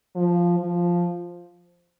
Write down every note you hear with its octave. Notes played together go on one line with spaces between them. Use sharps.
F3
F3